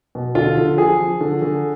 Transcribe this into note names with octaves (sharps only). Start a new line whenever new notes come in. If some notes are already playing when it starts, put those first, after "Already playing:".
B2
D3 F4
D3
F3 G#4
F3
D3
D3